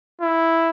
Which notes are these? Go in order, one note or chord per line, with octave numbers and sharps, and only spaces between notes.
E4